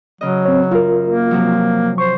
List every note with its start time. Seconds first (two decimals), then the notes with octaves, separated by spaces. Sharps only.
0.21 C#3 F#3 D#5
0.45 C4 C#5
0.71 F#2 F4 A#4
1.07 A#3
1.31 C3 F3 F#3
1.98 C5 C#6